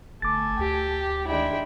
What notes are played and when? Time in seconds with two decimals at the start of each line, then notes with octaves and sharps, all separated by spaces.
0.22 G1 A3 A4 G#5 D6 A6
0.59 D2 G4
1.27 D#3 G#3 D4 E4 G5